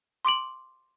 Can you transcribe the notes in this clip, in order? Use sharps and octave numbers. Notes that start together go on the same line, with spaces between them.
C6 D6 D7 F#7